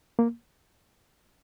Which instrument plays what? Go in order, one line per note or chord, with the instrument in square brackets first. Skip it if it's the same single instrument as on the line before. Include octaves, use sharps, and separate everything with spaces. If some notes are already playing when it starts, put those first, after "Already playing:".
[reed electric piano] A#3